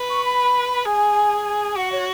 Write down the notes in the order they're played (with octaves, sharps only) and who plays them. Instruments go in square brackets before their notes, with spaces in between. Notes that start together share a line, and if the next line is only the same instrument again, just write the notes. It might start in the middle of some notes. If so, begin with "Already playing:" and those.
Already playing: [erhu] B4
[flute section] C#6
B5
[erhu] G#4 [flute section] G#5
[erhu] F#4 [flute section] F#5
[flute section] C#5